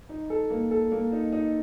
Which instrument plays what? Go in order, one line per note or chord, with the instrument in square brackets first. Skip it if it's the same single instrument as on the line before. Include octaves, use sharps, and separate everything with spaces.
[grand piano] D#4
A4
A#3
A4
A#3
D#4
D#4